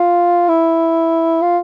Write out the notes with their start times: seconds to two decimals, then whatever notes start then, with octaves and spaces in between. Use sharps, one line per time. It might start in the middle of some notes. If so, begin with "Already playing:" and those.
Already playing: F4
0.49 E4
1.42 F4